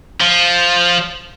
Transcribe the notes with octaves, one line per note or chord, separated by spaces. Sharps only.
F3